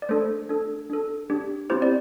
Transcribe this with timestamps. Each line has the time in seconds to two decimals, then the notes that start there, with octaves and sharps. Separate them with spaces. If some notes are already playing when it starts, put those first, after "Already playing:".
0.02 D5
0.09 A3 D4 A4 C5
0.49 D4 A4
0.90 D4 A4
1.30 D4 G4
1.70 C4 E4 G4 C5
1.82 D5